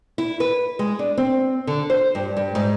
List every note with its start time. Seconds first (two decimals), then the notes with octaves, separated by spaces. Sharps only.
0.18 E4
0.40 B4
0.79 G#3
0.99 D4
1.18 C4
1.67 D3
1.90 C5
2.15 G2
2.37 G2
2.55 G#2